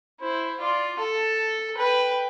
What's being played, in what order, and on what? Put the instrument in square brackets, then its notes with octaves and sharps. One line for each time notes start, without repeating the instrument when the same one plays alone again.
[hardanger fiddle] E4 [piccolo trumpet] C5
[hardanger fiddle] F4 [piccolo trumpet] D5
[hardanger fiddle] A4 [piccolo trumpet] A5
[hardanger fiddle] B4 [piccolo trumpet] G5